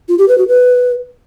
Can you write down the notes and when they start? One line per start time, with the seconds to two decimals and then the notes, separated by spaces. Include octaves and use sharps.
0.09 F4
0.18 G4
0.28 B4
0.38 F#4
0.48 B4